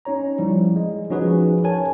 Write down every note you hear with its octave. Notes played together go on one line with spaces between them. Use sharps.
C#4 D#4 C#5 A#5
F3 G3 E4
G#3
F3 C#4 D#4 F#4 G#4 B4
A#4 C#5 G#5 A5